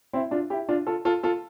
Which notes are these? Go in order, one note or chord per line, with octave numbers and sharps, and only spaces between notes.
C4 E4
D4 F4
E4 G4
D4 F4
F4 A4
F4 A4
F4 A4